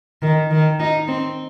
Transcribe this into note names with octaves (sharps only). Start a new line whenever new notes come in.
D#3
D#3
D#4
C4